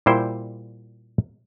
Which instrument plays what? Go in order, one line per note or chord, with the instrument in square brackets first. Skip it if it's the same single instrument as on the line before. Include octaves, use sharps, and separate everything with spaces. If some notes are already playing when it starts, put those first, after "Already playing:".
[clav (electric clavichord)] A#2 G3 E4 C5 G5